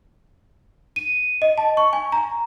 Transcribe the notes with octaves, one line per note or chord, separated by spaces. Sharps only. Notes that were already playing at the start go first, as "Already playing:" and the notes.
D#7
D#5
A5
C#6
G#5
A#5